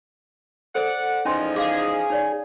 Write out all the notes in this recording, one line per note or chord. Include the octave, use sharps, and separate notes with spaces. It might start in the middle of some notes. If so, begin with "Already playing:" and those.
A4 C5 D5 F#5
E2 F3 C#4 D#4 G#5 C6
G#4 F5 D6
D#4 C#5 D5